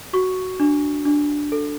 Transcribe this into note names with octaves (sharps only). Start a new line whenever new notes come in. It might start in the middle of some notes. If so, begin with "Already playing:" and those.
F#4 C#6
D4
D4
A4